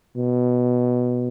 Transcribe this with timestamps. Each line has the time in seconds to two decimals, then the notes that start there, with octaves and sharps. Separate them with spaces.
0.17 B2